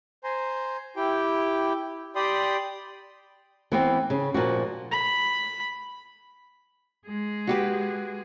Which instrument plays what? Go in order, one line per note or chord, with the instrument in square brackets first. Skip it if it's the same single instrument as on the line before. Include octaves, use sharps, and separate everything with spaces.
[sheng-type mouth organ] C5 G#5 A#5 C6
E4 G4 G5
G4 D5 G5 B5 C6 D#6
[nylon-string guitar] E3 B3 C4
C#3
A#2 F3 F#4
[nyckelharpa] B5
[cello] G#3 G#4
[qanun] F#4 G4 B4